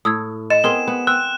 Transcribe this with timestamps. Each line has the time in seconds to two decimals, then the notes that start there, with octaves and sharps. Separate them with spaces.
0.05 A2 D#6 E6 G#6
0.50 D#5 A6 C#7 E7
0.64 B3 C4 G#4 A#4 C6 G7
0.88 B3
1.07 C4 E6 F#6